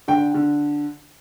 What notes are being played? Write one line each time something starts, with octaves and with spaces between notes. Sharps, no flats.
D3 G5
D3